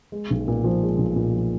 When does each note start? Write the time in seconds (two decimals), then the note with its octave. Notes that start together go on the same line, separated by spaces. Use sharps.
0.12 G#3
0.31 B1
0.48 A#2
0.64 F3
0.82 G#3
0.98 B1
1.16 A#2
1.33 F3